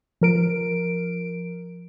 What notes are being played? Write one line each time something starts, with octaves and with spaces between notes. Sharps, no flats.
F3 A#4 D7